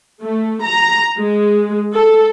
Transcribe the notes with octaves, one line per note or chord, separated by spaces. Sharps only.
A3
A#5
G#3
A4